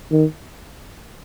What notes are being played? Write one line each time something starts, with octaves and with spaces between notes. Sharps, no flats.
D#3